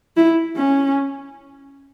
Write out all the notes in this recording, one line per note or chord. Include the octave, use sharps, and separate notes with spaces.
E4
C#4